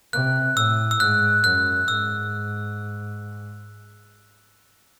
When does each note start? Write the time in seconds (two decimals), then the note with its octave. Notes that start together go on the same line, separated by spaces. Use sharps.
0.13 C3 F#6
0.56 A2 E6
0.91 E6
1.00 G#2 F#6
1.44 F#2 F#6
1.88 G#2 E6